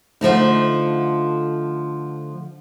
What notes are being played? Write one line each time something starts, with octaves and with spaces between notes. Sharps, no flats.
D3 F3 A3 D#4